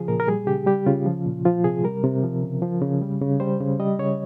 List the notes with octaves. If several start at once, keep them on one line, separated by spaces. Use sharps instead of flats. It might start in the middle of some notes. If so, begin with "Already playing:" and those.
Already playing: C#3 F3 G#4
A#2 A#4
A#4
G3 G#4
C#3 G4
G3 G4
C#3 F4
F3
A#2
F3 F4
C3 G#4
G3 A#4
C3
F3
C#3
F3
C#3
G3
C#3
G3 C5
C#3
G3 D#5
C#3 C#5